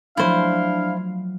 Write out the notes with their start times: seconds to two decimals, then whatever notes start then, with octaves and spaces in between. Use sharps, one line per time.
0.17 F3 F#3 A3 D4 E4 C5 F5